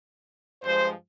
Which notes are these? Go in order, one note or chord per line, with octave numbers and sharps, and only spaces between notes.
G2 F3 G#3 C5